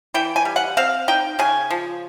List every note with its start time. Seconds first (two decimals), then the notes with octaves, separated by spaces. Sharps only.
0.14 E3 G5
0.36 G#5
0.45 G3
0.56 F#5
0.77 C4 F5
1.08 D#4 G5
1.39 C#3 G#5
1.70 F3